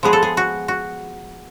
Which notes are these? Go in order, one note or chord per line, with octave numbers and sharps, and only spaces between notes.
F3 G#3 B3 G#4
A4
G#4
F#4
F#4